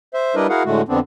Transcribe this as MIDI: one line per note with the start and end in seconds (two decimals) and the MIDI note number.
0.14 0.35 72
0.14 0.35 76
0.35 0.47 55
0.35 0.47 62
0.35 0.47 64
0.35 0.47 70
0.35 0.47 71
0.35 0.47 75
0.49 0.63 64
0.49 0.63 66
0.49 0.63 68
0.49 0.63 70
0.49 0.63 77
0.49 0.63 78
0.66 0.82 45
0.66 0.82 50
0.66 0.82 56
0.66 0.82 57
0.66 0.82 66
0.88 0.99 41
0.88 0.99 50
0.88 0.99 59
0.88 0.99 60
0.88 0.99 62